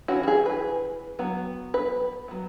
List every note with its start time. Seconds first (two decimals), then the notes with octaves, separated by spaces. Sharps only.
0.08 E3 C#4 F#4
0.23 F#4
0.28 G#4
0.46 B4
1.19 F#3 B3
1.74 B4
2.28 F#3 B3